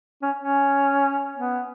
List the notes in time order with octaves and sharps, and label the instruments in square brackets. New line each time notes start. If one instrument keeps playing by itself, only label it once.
[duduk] C#4
C#4
B3